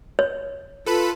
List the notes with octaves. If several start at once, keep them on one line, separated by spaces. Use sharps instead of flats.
C#5
F4 A4 B4 B5